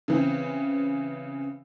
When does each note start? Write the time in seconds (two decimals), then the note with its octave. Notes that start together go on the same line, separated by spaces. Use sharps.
0.08 C#3 E3 C4